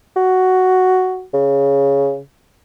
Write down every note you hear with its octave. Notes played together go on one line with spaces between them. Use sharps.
F#4
C#3